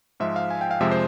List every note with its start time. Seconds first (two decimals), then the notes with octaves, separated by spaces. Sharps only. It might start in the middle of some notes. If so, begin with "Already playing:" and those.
0.20 G#2 F3 G#3 E5
0.36 F5
0.50 G#5
0.61 G5
0.71 F5
0.80 F2 C3 F3 G#3 E5
0.91 C5